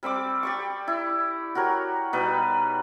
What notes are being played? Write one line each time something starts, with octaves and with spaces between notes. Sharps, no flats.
G3 C4 B5 D6
G4 D5 C#6
E4
F#4 G4 A#4 C#5
B2 G3 D#4 B4